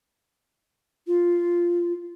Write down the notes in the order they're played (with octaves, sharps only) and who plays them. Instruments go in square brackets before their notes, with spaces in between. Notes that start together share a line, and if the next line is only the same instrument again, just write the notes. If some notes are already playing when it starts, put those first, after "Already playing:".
[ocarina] F4